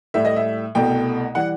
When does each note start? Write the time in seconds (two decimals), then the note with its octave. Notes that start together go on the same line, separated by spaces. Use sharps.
0.14 A2 G3 E5
0.25 D#5
0.36 E5
0.75 C2 B2 A3 G5
1.35 E3 G3 F#5